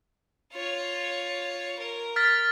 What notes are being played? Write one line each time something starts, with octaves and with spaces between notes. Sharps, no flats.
F4 C#5
A#4
F6 A6 B6